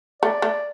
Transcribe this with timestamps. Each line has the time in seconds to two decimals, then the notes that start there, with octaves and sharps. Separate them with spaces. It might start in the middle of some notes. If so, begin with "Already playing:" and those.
0.22 A3 D5
0.42 A3